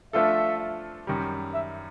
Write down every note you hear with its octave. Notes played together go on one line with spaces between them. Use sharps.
F3 A3 D4 F4 A4 E5
F#2 D#3 G3
E5